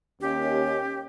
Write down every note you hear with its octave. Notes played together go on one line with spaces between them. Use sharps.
D#2 C#4 G4